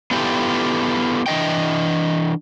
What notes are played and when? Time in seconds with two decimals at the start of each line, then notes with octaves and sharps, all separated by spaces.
0.11 B3 D4 E4 F4 G4 A4
1.26 E3 D4 D#5 G5